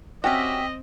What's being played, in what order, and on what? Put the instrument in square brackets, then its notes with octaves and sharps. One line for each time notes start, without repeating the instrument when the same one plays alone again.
[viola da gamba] C4 [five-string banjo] C#4 F#4 [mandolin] G4 E5 [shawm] D#5